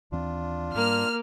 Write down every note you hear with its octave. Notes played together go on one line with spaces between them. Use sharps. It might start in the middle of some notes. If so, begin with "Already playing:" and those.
D#2 E3 C4 D4 F4
G#2 G3 A#3 F6